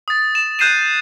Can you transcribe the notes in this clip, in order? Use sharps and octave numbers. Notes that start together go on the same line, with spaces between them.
D#6 A6
E7
F#6 G6 C7 D#7 E7